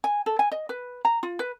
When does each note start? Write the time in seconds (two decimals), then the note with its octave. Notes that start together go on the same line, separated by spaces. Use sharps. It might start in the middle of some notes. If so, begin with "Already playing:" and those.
0.04 G#5
0.26 A4
0.39 G#5
0.52 D#5
0.69 B4
1.05 A#5
1.23 F4
1.39 B4